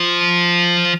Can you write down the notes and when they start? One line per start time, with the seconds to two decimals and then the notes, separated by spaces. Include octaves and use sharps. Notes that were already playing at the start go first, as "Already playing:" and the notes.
Already playing: F3